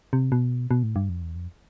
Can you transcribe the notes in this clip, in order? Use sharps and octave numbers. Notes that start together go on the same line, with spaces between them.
C3
B2
B2
A2
G2
F2
E2
F2